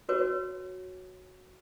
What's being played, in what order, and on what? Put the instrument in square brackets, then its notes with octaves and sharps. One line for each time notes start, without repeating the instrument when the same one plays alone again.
[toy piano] F#4 B4 C#5